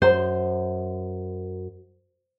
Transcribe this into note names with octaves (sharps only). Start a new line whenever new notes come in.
F#2 C5